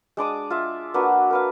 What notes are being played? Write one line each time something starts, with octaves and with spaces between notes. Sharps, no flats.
G#3 D4 D6 D#6
F4 E5
A#3 D4 F#4 B4
A#4 B4 F5